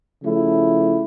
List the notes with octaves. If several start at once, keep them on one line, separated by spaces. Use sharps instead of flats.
C#3 F3 A3 E4